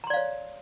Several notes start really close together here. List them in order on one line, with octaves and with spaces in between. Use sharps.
A#5 C6 D5 F5 C#5